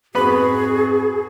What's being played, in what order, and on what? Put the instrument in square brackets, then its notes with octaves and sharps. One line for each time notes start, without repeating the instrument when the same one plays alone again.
[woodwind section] F2 G#2 F#4 [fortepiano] B3 B4 B5 [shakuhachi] G#4